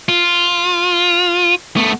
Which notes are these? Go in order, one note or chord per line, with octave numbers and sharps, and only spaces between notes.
F4
A3 B3